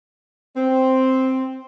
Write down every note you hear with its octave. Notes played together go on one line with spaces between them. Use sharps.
C4